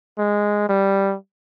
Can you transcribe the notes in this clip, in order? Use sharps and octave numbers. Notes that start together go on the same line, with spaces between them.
G#3
G3